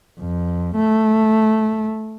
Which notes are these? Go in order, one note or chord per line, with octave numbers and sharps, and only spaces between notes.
F2
A3